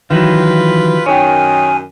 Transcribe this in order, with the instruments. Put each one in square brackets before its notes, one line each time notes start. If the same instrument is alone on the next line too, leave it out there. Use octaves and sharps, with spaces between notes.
[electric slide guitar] D#3 E3 F#3 [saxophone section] F4 G4 B4
[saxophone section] F#2 D#3 [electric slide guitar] C#5 G5 [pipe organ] G#5